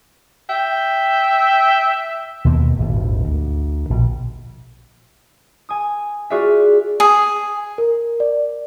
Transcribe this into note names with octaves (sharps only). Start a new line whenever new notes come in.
E5 G5
D#2 B2 A#3
D#1 G#1 G2
D2
A#1 B2
G#5 D#6
F4 F#4 G#4 D5 E5
G#4
A#4
D5